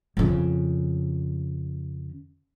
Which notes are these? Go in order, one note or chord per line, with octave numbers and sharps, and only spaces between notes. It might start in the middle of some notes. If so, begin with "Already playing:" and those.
F2 C#3